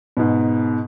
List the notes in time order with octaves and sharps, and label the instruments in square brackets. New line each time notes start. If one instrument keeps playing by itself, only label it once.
[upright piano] G#2 B2